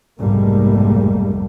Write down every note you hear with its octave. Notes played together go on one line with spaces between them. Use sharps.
F1 B1 G#2 G3 A3 A#3